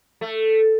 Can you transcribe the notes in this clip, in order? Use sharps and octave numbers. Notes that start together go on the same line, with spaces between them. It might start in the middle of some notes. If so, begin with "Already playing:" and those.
A3